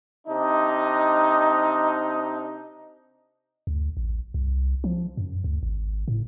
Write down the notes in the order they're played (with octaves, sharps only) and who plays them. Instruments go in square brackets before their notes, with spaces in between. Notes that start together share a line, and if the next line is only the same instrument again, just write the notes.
[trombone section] C3 D4 D#4
[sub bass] D2
A1
C2
F3
F#2
D2
G#1
A2